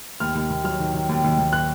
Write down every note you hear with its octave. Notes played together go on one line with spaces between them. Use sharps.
D#2 F6
D#2
D#2
F#3 F6
D#3
D#3
D#2
D#2
D#2
F#6